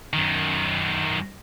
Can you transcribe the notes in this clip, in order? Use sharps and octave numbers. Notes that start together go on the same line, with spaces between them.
F#2 D#3